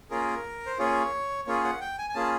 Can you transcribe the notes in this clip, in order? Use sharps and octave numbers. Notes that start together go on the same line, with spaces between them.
A#3 C#4 F4 G#4 A#4
C5
A#3 C#4 F4 G#4 C#5
A#3 C#4 F4 G#4 C#5
F#5
G5
G#5
G#5
A#3 C#4 F4 G#4 A5